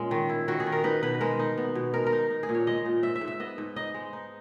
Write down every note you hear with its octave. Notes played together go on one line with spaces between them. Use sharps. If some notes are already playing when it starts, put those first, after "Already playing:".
Already playing: A#2 G#3 C#4
D#3
E4
D#3 F#4
G#4
D#3
A#4
D#4 B4
B2 B4
G#3 A#4
D#4
B3
B2
G#3 A#4
A#4
D#4
D#4
G#4
A#2
C#5
G#3 D#5
A#2
G#2 E5
E5
G#2
E5
B3 D#5
G#2
D#4 D#5
G#3
D#4